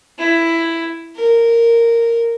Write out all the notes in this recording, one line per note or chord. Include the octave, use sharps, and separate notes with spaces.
E4
A#4